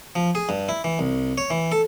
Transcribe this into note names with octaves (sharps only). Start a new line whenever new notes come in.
F3
G#4
G2
E4
E3
C2
C#5
E3
A4